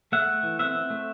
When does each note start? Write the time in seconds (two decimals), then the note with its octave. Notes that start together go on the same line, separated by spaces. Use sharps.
0.12 A3 E5 F#5
0.28 A3
0.43 E3
0.59 C4 E5 F#5
0.75 C4
0.90 A3